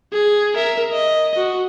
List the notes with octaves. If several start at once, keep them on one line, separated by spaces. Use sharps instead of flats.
G#4
A#4 E5
D#5
F#4